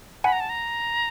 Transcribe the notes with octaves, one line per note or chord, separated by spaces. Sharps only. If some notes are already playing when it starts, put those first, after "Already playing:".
F#5 G#5 B5
A#5
A5
A#5